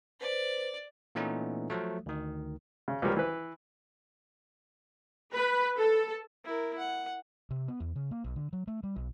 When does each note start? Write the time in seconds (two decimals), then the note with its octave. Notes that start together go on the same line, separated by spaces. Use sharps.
0.21 B4 C5 D5
1.15 A#2 E3 A3 B3 C#4 D#4
1.70 F3 F#3 A3
2.06 D2 D#3
2.88 C#3
3.02 C#2 F3 G3 A#4
3.17 E3 B4
5.34 B4
5.78 A4
6.44 E4 A#4
6.78 F#5
7.50 C3
7.68 B3
7.80 E2
7.96 C#3
8.11 A#3
8.24 B1
8.36 D3
8.53 F#3
8.67 A3
8.83 G3
8.96 B1